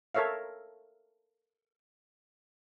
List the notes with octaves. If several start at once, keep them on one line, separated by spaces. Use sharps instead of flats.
A4 A#4 C#5 E5 F5